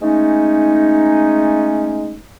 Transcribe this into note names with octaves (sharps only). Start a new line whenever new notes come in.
G#3 A3 C#4 D#4